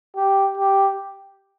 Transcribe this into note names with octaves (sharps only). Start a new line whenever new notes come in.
G4
G4